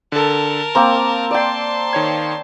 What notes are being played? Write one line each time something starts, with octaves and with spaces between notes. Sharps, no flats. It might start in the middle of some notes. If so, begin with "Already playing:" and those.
D3 A4 A#4 A5
A#3 C4 A#5
D5 G5 A5 C6
D#3 C#5 G#6